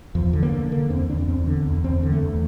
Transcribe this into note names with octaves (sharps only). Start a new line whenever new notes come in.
E2 F3
D3
A#3
D3
D3 A#3
E2 C4
E2 D4
E2 C4
D3
E2
E2 C4
D3
A3
E2